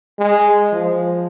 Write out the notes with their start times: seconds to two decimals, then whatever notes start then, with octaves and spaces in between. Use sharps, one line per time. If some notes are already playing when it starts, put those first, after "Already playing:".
0.19 G#3
0.73 F3